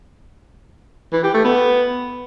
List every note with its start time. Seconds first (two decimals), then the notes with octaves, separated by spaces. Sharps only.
1.13 E3
1.23 G4
1.34 A3
1.44 B3